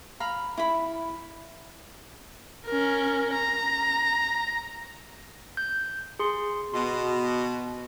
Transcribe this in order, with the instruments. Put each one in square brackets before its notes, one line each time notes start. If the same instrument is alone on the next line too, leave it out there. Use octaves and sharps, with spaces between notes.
[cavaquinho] F5 A#5 B5
E4 B5
[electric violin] C#4 A#4
A#5
[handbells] G6
G#4 C6
[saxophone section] B2 [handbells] C6